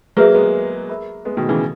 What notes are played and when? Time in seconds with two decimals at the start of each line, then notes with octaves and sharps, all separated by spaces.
0.17 F#3 A#3 G#4 B4 E5
0.35 G#3 B3
0.89 A#4 E5 B5
1.25 G#3 B3
1.37 B2 D#3
1.49 C#3 E3